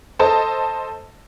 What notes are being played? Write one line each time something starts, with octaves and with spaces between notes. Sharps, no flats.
A4 C5 D#5 A5